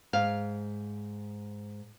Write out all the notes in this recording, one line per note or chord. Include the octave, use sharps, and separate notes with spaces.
G#2 F5